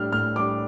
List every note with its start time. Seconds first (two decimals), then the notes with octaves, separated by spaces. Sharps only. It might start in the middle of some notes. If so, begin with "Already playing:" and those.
Already playing: A2 G3 D4 F6
0.12 A2 F6
0.36 G3 D4 D6